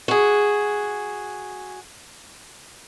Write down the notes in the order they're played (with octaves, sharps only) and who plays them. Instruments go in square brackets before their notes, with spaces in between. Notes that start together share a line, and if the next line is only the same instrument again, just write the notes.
[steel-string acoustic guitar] F#4 G#4